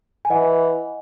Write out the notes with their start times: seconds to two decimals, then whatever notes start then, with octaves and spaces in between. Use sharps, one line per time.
0.25 G#5
0.30 E3 D#5 F#5